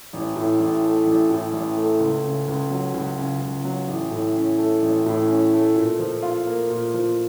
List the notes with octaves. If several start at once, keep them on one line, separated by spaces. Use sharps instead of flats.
A1
A2
A1
A3
A1
A2
A1
A3
C#2
C#3
C#2
F#3
C#2
C#3
C#2
F#3
A1
A2
C#4
A3
A1
A2
C#4
A3
A#2
F3
F4
A#3
A#2
F3